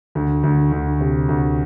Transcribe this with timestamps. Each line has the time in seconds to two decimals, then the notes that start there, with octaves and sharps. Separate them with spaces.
0.15 D2
0.43 D2
0.72 D2
1.00 C3
1.29 D2